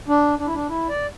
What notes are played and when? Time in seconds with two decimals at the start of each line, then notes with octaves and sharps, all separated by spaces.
0.08 D4
0.39 D4
0.47 E4
0.54 D4
0.69 E4
0.89 D5